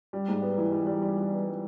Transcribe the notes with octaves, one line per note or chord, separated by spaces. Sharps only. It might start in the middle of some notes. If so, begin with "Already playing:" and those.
G3
G#2
B3
E3
G3
G3
G3
G3
B3
G3